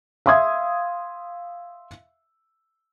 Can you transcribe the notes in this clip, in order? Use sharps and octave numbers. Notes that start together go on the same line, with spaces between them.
E5 F5 C6 D#6 G#6